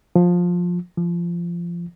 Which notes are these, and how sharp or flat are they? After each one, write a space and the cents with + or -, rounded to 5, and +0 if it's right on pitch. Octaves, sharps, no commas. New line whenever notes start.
F3 +15
F3 -20